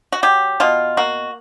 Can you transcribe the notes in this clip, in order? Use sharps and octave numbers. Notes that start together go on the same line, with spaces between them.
F#4
F#3 G4
B2 F4
A#3 F#4